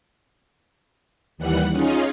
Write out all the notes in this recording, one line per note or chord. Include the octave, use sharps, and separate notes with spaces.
D#2 E3 G3 F#5 F#6
C#4 D#4 F4 G#4